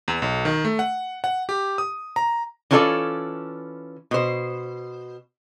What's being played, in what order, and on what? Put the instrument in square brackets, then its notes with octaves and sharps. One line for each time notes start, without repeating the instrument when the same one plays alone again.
[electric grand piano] E2
B1
D#3
A3
F#5
F#5
G4
D#6
A#5
[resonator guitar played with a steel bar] E3 C#4 D4 F4 A4 D5
B2 C5